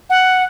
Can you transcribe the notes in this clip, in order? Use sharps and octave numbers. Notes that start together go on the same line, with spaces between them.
F#5